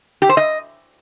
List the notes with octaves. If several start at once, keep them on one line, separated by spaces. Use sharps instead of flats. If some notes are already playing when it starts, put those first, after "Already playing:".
G4
C5
D#5